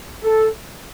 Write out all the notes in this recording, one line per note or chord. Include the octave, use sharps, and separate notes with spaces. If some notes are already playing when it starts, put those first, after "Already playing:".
A4